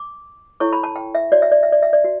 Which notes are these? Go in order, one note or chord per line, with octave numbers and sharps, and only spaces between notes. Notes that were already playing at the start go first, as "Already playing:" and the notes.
Already playing: D6
E4 A4 C#5 C#6
B5
A5
G5
E5
F#4 C#5 D5
E5
D5
E5
D5
E5
D5
F#4